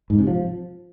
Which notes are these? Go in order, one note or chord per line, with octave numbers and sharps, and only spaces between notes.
G#2
C3
F3